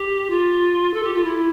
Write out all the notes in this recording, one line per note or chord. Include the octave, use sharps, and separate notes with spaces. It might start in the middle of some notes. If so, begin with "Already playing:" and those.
Already playing: G4
F4
A4
G4
F4
E4